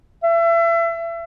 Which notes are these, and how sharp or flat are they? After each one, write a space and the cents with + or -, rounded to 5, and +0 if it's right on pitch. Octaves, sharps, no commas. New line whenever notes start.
E5 +30